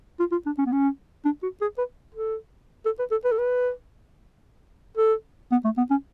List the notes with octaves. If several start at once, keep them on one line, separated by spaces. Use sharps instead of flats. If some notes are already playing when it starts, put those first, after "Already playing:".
F4
F4
D4
C#4
B3
C#4
D4
F#4
G#4
B4
A4
A4
B4
A4
B4
A4
B4
A4
B3
A3
B3
C#4